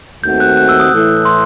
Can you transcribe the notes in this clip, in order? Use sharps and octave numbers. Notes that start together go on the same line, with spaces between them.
D#2 D#3 A3 C4 F#4 G6
F#6
F#6
E6
D#6
A2 E3 A3 E4 A4
C6